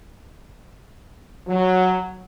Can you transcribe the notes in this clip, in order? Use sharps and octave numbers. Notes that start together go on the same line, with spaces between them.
F#3